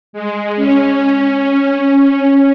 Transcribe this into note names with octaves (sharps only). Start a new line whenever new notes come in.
G#3
C#4